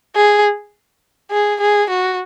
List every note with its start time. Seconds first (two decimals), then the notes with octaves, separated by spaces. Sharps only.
0.16 G#4
1.31 G#4
1.61 G#4
1.90 F#4